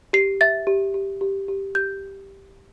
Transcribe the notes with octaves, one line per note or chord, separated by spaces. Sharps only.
G4 C7
E5 A6
G4
G4
G4
G4
G4 G6